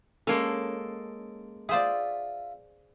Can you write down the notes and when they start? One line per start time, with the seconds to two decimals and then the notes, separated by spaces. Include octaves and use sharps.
0.27 G#3 A#3 C#4 A4
1.69 F4 G#4 C5 D5 E5